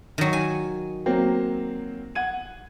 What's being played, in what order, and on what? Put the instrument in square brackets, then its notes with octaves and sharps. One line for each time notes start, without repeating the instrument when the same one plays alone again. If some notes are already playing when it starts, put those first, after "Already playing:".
[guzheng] D#3 F#3
G#5
[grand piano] F#3 A#3 C4
F#5 G#6 D#7